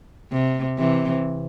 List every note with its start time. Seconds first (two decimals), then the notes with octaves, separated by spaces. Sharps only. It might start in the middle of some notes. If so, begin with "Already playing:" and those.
0.32 C3
0.78 C3 E3